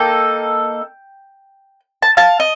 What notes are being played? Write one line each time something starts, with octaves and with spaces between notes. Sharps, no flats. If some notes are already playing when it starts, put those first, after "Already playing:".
Already playing: A#3 D#4 A4 G5
A5
F5 A5
D#5